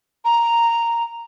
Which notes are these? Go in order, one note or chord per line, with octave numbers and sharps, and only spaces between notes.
A#5